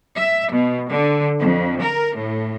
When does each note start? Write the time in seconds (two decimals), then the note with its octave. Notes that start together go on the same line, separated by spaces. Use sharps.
0.16 E5
0.50 B2
0.89 D3
1.41 F2
1.82 A#4
2.16 A2